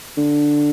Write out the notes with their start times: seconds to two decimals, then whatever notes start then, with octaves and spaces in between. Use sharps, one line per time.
0.17 D3